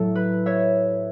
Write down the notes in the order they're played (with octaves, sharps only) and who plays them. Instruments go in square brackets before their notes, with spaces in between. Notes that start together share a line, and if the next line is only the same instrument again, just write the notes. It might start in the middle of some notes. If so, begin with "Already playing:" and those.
Already playing: [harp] A2 F#3 A3 A4
B4
C#5 E5